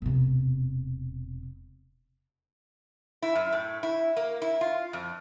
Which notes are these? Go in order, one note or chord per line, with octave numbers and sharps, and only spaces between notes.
E1 C3
E4
F#2
A2
E4
A#3
E4
F4
F2